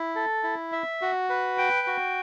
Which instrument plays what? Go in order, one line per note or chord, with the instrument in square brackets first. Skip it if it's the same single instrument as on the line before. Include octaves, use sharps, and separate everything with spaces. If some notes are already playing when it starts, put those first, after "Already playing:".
Already playing: [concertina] E4
A4
E4
E5
F#4
B4
G5
F#4